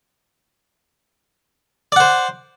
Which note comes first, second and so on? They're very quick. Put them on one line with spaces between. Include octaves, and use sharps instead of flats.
D5 F#5 C5